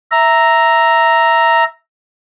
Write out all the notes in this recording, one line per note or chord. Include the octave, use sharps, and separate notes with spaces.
E5 A#5